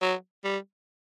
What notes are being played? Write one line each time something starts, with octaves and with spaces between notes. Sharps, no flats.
F#3
G3